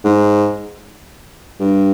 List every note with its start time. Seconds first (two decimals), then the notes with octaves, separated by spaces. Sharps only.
0.05 G#2
1.60 G2